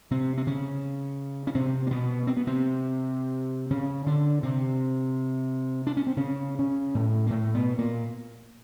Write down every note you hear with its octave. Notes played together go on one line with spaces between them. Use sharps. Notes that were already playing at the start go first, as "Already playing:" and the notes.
C3 C4
C4
C#3 C#4
C#4
C3 C4
A#3
B2 B3
C4
B3
C3 C4
C#3 C#4
D3 D4
C3 C4
D4
C#4
C4
C#3 C#4
C#3 C#4
A2 A3
A#3
A2 A3
B2 B3
A#2 A#3